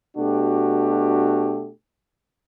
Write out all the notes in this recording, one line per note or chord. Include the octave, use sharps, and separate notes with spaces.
B2 A3 D4 F#4 G4